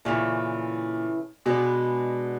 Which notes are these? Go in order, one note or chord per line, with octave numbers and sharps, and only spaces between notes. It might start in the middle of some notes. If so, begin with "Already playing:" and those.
A#2 C#3 E3 A3
B2 G#3 B3 D4